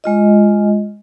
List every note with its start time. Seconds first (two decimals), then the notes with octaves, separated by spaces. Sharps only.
0.04 G#3 F4 D#5